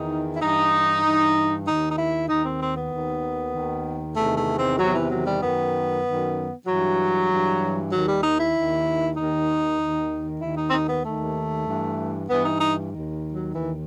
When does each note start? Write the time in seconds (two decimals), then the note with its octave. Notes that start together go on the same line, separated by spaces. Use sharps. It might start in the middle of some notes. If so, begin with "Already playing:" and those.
Already playing: E2 D#3 D#4
0.35 E4
0.41 G2 E3 D#4
1.04 G2 E3
1.66 D#2 D#3 D#4
1.90 D#4
1.98 E4
2.29 D#2 D#3 D#4
2.44 C4
2.61 C4
2.76 B3
2.92 D#2 D#3
3.54 D#2 D#3
4.16 E2 C3 D#3 A3
4.37 A3
4.58 C4
4.78 E2 C3 D#3 F#3
4.94 E3
5.10 F#3
5.26 G3
5.41 F#2 D#3 B3
6.04 F#2 D#3
6.66 G2 E3 F#3
7.28 G2 E3
7.92 D#2 D#3 F#3
8.07 G3
8.23 D#4
8.39 E4
8.54 D#2 D#3
9.16 D#2 D#3 D#4
9.80 D#2 D#3
10.41 D#2 D#3 E4
10.57 D#4
10.68 C4
10.73 D#4
10.89 B3
11.04 D#2 D#3 A3
11.66 G2 E3
12.29 G2 E3 B3
12.44 D#4
12.60 D#4
12.91 D#2 D#3
13.33 F#3
13.54 D#2 D#3 E3